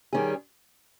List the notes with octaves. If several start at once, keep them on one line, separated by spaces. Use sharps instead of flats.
D#3 G3 C#4 G#4